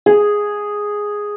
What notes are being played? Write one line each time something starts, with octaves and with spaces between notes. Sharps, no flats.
G#4